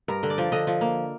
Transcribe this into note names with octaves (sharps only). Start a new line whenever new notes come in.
G2 A#4
D3
D5
F3
D3 D#5
F3
A#3